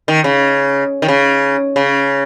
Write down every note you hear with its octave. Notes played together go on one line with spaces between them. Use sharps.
D#3
C#3
D#3
C#3
C#3